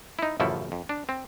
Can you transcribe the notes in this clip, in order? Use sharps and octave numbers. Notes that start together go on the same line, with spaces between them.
D#4 E4
A1 F#2 C#3 F3 E4 A4
F2
D4
C4